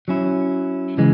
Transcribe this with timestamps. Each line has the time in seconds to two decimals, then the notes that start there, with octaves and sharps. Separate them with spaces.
0.08 F#3 C#4 E4
0.98 C#3 E3 G#3